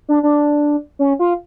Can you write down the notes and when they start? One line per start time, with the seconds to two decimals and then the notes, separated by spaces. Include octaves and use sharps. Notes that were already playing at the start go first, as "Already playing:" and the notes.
0.09 D4
0.23 D4
0.99 C#4
1.19 F4